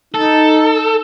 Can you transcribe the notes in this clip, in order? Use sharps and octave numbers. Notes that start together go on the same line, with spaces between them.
D#4 A4